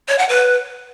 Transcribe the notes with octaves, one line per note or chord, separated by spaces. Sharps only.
C#5
F#5
B4